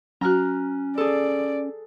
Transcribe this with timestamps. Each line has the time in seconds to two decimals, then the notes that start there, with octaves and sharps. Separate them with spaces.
0.21 F#3 C#4 F#4 A#5 F6 F#6
0.98 G#4 A4 D5